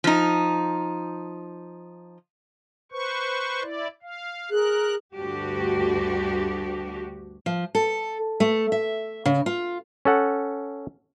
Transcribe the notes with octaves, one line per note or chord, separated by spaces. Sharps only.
F3 D#4
B4 C5 C#6
E4 D5
F5
G#4 A#4 F#6
D2 G2 D4 F#4 G4
F3
A4
A3
E5
C#3
F4
C#4 A4 F#5